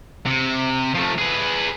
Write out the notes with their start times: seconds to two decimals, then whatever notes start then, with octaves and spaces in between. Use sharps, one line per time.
0.26 C3
0.95 F3 A3
1.18 G#4 B4